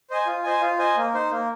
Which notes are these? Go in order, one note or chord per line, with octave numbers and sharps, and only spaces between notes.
C5 D#5 G#5
F4
C5 D#5 G#5
F4
C5 D#5 G#5
A#3
D#4 C5
A#3